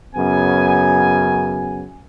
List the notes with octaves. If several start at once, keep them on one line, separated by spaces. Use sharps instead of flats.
F#2 C#3 B3 G#5